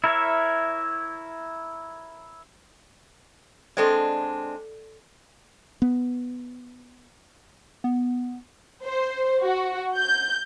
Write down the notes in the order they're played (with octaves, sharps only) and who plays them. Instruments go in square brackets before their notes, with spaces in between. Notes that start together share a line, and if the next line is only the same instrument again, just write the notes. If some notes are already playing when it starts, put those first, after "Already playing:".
[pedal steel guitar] E4 A#4 C#5 E5
[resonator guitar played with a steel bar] G#3 C4 D4 [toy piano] A4 D5
[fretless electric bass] B3
[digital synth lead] B3
[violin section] C5
F#4
G6